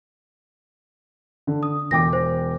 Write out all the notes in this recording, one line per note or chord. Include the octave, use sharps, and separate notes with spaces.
D3
D#6
E1 G5 D6 A#6
C5